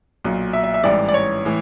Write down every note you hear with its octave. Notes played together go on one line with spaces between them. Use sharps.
B1 A#2 F#3
E5
E5
E5
A1 G#2 E3 G3 D5
D5
C#5
A2 E3